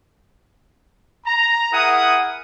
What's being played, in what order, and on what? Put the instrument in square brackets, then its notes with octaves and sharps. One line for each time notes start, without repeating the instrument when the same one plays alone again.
[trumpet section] A#5
E4 G#4 A#4 F#5 D#6